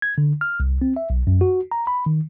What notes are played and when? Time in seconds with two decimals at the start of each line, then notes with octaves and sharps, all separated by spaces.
0.02 G#6
0.18 D3
0.41 F6
0.60 C2
0.82 C4
0.96 E5
1.10 B1
1.27 F#2
1.41 F#4
1.71 A#5
1.87 B5
2.06 D#3